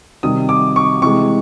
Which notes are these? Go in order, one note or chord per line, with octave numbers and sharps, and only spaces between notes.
C3 D#3 G3 D#6
D6
C#6
C3 E3 G#3 C#6